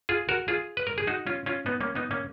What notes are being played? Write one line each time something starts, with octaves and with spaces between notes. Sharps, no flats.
F4 G#4
F#4 A#4
F4 G#4
B4
A#4
G#4
D#4 F#4
C#4 F4
C#4 F4
B3 D#4
A#3 C#4
B3 D#4
A#3 C#4